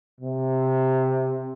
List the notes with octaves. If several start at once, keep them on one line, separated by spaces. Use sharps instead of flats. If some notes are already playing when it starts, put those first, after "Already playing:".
C3